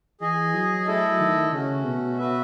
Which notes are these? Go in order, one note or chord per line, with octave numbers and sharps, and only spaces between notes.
E3 G#4 D#5 G#5
F#3
A3 E4 A4 D#5
D#3
C#3 A3 C#4 F#4
B2
F#4 B4 E5